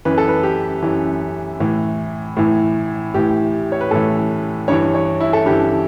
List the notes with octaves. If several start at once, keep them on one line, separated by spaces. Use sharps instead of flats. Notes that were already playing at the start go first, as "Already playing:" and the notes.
F#2 E3 B4
A4
B4
G4
F#2 E3
A2 E3
A2 E3
A2 E3 G4
C#5
B4
A2 E3 A4
G2 E3 C#5
C#5
E4
A4
G2 E3 G4